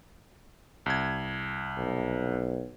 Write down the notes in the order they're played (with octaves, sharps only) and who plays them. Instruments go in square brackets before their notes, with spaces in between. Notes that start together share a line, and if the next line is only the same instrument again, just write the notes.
[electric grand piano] C2 G#6
[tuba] B1